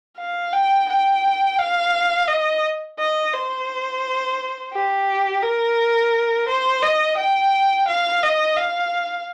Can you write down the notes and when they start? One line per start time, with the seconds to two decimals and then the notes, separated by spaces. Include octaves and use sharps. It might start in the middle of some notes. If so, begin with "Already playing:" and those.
0.19 F5
0.53 G5
0.89 G5
1.59 F5
2.28 D#5
2.99 D#5
3.33 C5
4.73 G4
5.42 A#4
6.48 C5
6.82 D#5
7.18 G5
7.88 F5
8.23 D#5
8.57 F5